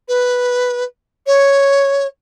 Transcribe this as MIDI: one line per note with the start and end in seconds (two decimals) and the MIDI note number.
0.08 0.84 71
1.26 2.07 73